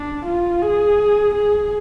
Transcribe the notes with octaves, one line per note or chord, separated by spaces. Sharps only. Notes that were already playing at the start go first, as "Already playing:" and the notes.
Already playing: D4
F4
G#4
G#4